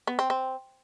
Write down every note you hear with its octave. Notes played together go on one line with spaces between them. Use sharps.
B3
C4
C4